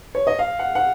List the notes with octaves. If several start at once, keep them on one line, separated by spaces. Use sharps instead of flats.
C#5
D#5
F5
F#5
F#5